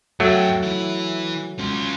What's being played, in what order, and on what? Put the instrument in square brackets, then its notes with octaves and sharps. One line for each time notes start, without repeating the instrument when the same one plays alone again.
[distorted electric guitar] F#2 G5 [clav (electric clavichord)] F#3 A3
[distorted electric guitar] E3 E4
C#4 F4